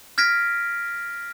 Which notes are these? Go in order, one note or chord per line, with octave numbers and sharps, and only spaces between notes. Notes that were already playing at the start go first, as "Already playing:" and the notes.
F6 G#6 A#6 B6 D7